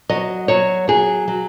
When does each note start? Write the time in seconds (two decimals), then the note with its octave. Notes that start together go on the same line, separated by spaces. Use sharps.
0.09 F#3 D#5
0.48 F#3 C#5
0.88 F#3 G#4
1.28 F#3